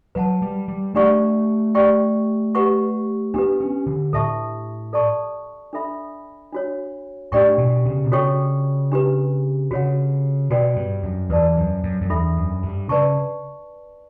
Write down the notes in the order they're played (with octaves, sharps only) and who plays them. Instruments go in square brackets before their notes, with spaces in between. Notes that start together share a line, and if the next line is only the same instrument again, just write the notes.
[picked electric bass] F#3 [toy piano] B4 F#5 A5
[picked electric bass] G3
G3
[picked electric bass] A3 [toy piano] D4 G4 D5 F#5 C#6
[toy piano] G4 D5 G5 C#6
G4 B4 F#5 C#6
[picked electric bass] B3 [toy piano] D4 G4 B4
[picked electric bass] C#4
D3
[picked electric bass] A2 [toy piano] A4 E5 A5 C#6
[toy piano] A4 D5 A5 C#6
D4 A4 E5 B5
D4 F#4 C#5
[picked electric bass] A2 [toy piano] D4 G4 D5 G5 C#6
[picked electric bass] B2
C#3
B2
[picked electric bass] C#3 [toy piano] F#4 A4 C#5 G5 C#6
[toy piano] D4 G4 B4
[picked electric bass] C#3 [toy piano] F#4 C#5 F#5
[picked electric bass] B2 [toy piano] F#4 B4 D5 G5
[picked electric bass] G2
F#2
[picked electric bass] E2 [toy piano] B4 D5 A5
[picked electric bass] F#2
F#2
F#2
[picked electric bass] E2 [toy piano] D4 A4 E5 B5
[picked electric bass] F#2
G2
[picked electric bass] C#3 [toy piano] B4 D5 A5 C#6